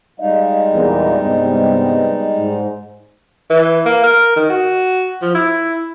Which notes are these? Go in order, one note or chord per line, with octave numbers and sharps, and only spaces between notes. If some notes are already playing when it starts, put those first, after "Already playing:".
G3 G#3 D#4 D#5 F5
E2 A#2
G2 C3 B3
G#2
E3
A#3
A#4
D#3
F#4
F3
E4